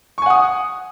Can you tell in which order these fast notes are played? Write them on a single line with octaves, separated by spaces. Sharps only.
C#6 G#5 F#5 D#6